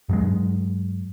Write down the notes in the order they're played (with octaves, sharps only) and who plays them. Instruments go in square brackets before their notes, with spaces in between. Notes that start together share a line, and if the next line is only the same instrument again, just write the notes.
[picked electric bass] G2 F#3 G#3